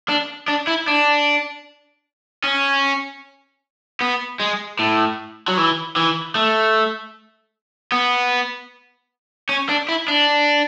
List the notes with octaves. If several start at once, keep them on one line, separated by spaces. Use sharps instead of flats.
D4
D4
E4
D4
C#4
B3
G#3
A2
F#3
E3
E3
A3
B3
C#4
D4
E4
D4